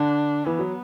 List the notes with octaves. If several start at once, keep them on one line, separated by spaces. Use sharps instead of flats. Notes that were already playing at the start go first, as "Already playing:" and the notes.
Already playing: D3 D4
E3 B3
F#3